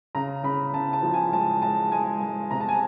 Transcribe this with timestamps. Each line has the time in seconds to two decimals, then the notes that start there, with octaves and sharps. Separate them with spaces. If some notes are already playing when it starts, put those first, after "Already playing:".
0.15 C#3 A#5
0.43 C#3 B5
0.74 C#3 A5
0.93 A5
1.03 F3
1.14 G#5
1.32 G#3 A5
1.62 G#3 A5
1.92 G#3 G#5
2.22 G#3
2.51 C3 A#5
2.61 A5
2.69 G#5